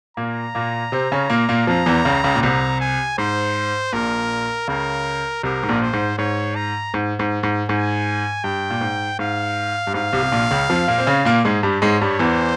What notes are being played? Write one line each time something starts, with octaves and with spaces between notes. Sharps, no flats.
A#2 A#3 A#5
A#2 A#3
C3 C4
C#3 C#4
A#2 A#3
A#2 A#3
F2 F3 A#5
E2 E3
C#2 C#3
C#2 C#3
A#2
C2 C3 A#5
G#5
G#2 C5
A#1 A#2 A#4
C#2 C#3 A#4
C2 C3 A#4
G#2
A#1 A#2
C5
G#2
G#2 C#5
A#5
G#2
G#2
G#2
G#2 G#5
G2 G5
A#2
G#2
G#2 F5
G2
G#2 F5
C2 C3
C3
A#1 A#2
C#2 C#3
F2 F3
A#2 A#3
C4
C#3 C#4
A#2 A#3
G#2 G#3
G2 G3
G#2 G#3 C#5
G2 G3
E2 E3 C5